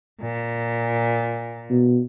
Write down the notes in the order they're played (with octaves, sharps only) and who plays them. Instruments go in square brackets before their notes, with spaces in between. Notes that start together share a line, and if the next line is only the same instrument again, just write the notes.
[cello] A#2
[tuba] B2